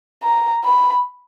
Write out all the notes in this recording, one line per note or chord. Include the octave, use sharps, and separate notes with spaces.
A#5
B5